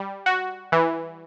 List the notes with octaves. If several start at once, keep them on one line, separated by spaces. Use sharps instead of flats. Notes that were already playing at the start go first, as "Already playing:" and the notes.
Already playing: G3
F#4
E3